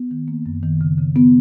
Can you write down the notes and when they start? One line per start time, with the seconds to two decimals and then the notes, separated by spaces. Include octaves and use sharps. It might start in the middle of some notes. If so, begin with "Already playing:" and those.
Already playing: B3
0.11 D#3
0.28 A#3
0.46 F#2
0.63 D#3
0.81 C#3
0.98 C#3
1.16 B3